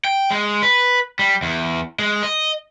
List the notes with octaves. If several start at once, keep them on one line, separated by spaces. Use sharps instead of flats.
G5
G#3
B4
G3
E2
G#3
D#5